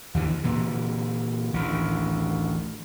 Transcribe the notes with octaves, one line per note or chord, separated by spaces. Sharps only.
D#2 D3 E3
A#2 D3 E3
A1 D2 D#3